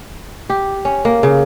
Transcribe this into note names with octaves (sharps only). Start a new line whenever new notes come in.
G4
C#4
A#3
C#3